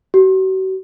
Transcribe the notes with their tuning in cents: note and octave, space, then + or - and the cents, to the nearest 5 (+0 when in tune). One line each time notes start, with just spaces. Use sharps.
F#4 +40